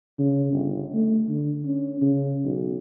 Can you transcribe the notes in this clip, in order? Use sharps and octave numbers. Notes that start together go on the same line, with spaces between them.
C#3
G1
A3
D3
C#4
C#3
B1